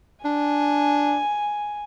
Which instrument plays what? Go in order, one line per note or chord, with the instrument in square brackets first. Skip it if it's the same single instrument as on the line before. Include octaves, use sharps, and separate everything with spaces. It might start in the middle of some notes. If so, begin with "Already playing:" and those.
[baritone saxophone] D4 [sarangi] G#5